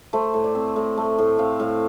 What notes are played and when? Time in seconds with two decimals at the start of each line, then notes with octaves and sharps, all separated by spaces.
0.13 A3 C5
0.34 A2
0.44 D5
0.55 C4
0.76 A2
0.97 A3
1.18 A2
1.38 C4 F5
1.60 A2 F5